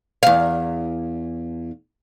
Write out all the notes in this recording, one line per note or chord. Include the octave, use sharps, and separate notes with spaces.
E2 F5